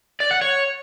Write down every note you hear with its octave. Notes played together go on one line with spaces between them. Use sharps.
D5
F#5
C#5